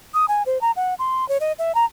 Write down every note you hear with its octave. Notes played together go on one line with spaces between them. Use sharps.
D#6
G#5
C5
A#5
F#5
C6
C#5
D#5
E5
A#5